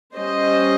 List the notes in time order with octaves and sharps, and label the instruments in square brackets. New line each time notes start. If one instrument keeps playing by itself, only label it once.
[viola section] G3 C#4 C5 D#5